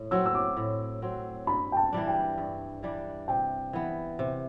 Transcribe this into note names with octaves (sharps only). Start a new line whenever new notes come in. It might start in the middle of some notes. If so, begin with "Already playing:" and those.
Already playing: A2
F#3 C4 F#4 E6
E6
D6
A2
F#3 C4 F#4
G2 B5
G5
A5
E3 G3 D4
G5
G2
E3 G3 D4
C3 G5
E3 B3
C3